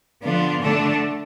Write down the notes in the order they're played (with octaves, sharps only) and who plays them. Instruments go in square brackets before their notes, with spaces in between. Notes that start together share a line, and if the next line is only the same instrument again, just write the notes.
[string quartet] D3 F3 B3 D4 F4
D3 A3 D4 A4